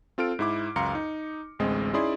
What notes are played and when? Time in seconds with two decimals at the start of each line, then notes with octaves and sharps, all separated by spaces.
0.18 C4 F4 A4 F6 D7
0.39 G#2 E4 D6
0.76 C#2 F#2 F5 A#5 C6 C#7
0.95 D#4
1.59 A1 D2 G#3 C4 D#5
1.93 C#4 D#4 E4 G#4 D5 C6